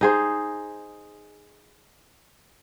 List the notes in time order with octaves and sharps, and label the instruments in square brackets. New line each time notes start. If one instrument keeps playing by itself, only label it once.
[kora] D#4 G#4 C5